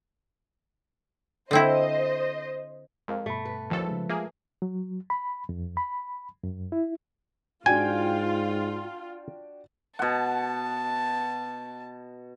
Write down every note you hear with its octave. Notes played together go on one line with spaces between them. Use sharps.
D3 C4 E4 C5 D#5
F2 G#3 A#4 F5
G2 B2 A3 B5
B4
A1 D#2 F3 A4
C#3 G#3
G#3 A#3 F4 G#4 E5
F#3
B5
F2
B5
F#2
E4
G#2 D4 F4 F#4 G5 G#5
B2 F#5 A5